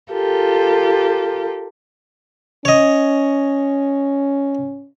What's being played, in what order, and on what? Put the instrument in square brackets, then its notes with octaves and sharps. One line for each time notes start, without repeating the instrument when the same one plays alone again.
[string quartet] F4 G4 A4 A#4
[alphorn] C#4 [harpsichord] C#5 D#5